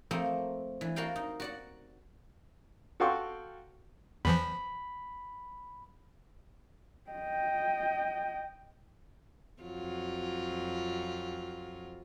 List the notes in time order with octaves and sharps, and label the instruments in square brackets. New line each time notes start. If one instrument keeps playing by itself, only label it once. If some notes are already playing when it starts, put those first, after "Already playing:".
[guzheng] F3 A3 A#3 C4 D#5
E3 D4
F#4 A#4 D5 F5 G5
D#4
F#4 D5 F#5
[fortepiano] F#4 A4 F5 G5 C6 C#6
[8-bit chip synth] E2 E3 F3 [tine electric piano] B5
[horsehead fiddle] D#5 G5
[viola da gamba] F2 F#3 F4